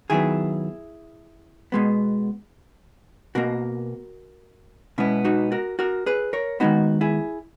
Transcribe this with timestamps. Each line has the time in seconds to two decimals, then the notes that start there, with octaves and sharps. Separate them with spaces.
0.10 D#3 F#3 B3 E4 G#4
1.72 B2 G#3 B3
3.35 B2 A#3 F#4 A#4
4.98 B2 G#3 B3 C#4 E4
5.25 D#4 F#4
5.52 F#4 A#4
5.79 F#4 A#4
6.06 G#4 B4
6.33 A#4 C#5
6.60 D#3 G#3 B3 D#4 F#4
7.01 E4 G#4